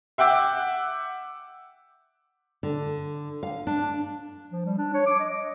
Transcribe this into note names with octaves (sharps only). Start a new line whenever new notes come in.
E5 F#5 G5 D6 E6
D3
F5
D4
F3
G3
D4
C#5
D6
D#5
D#5